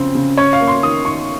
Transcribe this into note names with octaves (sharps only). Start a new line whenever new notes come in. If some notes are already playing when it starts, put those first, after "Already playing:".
Already playing: C#3 F3 C4
C#3
C#4 C#5
F5
A#3
C6
D#3 D#6
D#3 C#6